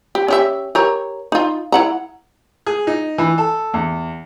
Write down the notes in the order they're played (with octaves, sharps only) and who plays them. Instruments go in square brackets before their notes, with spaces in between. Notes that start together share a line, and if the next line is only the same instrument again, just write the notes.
[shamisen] G4
C#4 G4 E5
G4 A#4 C#5
D#4 F4
E4 F#5 A#5
[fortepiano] G#4
D#4
E3
A4
E2